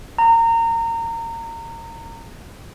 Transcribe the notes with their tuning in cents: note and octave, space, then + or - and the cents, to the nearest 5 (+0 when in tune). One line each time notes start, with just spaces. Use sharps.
A#5 -25